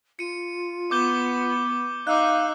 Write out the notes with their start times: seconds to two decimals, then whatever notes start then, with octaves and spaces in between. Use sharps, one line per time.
0.19 F4 C#7 D#7
0.91 B3 D6 G6 G7
2.07 D#4 F5 D6 E6 F#6